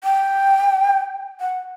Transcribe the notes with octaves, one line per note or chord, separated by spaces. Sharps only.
G5
F#5